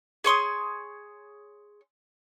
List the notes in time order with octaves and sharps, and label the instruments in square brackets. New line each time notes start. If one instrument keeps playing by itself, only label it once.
[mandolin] G#4 C#5 C6 D#6